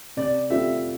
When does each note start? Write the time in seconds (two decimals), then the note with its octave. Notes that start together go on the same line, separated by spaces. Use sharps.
0.17 C3 D5
0.50 G3 C4 F4 A4 E5